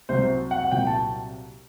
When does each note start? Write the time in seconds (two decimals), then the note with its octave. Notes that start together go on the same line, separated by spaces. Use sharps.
0.09 C2 C3 F#3 C5
0.51 F#5
0.71 C2 A#2 F#3 G5
0.87 A5